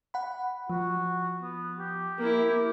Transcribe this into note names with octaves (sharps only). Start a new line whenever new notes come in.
F#5 B5
F3 F#4
B3
G4
A#3 E4